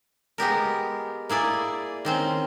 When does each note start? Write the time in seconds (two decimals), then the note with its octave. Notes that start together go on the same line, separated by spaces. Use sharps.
0.38 G#3 B3 G4 A#4
1.29 A#3 E4 G#4 D5
2.05 D#3 C4 C#4